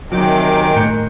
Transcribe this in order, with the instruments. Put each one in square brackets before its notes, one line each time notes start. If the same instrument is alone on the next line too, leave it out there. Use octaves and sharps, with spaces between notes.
[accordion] C3 G5 D6 [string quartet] D#3 G#3 A#3 [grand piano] F#3
[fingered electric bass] A2 [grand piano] F#6 G6 C#7